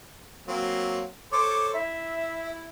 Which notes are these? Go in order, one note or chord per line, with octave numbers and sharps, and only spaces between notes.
F#3 A#3 C4
A4 C5 C#5 D6
E4 E5